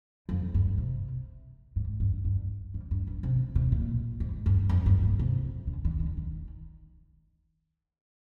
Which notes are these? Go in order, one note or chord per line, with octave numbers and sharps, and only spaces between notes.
F2
G2
C3
G#2
G2
G2
G#2
G2
G2
C3
C3
A#2
G#2
G2
F2
G2
A#2
C3
D3
D#3
D3
D#3